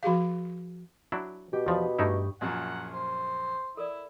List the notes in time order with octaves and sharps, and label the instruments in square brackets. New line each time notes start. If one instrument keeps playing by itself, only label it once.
[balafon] F3 F#4 G#4 F5
[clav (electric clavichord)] F#3 D4 E4
[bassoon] B2 [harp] G4
[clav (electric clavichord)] E2 F3 [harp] B5 D#6
[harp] G2 G4 C#6 [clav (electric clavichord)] A3 D#4 E4
[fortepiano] A#1 F#2 A#2 [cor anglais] F#5
[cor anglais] C5
[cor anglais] E4 [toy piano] A4 A#4 D5